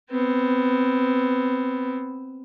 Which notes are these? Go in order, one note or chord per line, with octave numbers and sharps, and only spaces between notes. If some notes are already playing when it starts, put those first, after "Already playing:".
B3 C4